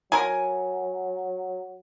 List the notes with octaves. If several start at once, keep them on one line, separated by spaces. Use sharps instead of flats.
F#3 A#4 G#5